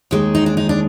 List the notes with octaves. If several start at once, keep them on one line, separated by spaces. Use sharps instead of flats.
D#2 D#3 G#3
D#4
D4
D#4
D4